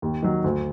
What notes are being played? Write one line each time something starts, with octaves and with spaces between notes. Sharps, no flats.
D#2
D#3 F#3
D2